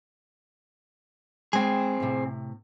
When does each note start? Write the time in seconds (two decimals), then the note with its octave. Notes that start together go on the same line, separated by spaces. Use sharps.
1.53 G#3 C4 G#4 G5
2.00 A2 C3